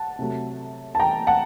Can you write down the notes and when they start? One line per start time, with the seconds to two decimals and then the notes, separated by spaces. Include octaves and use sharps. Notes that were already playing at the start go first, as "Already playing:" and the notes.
Already playing: F#5 A5
0.19 C3 F#3 A3
0.95 A5
1.00 G5 A#5
1.27 F#5 A5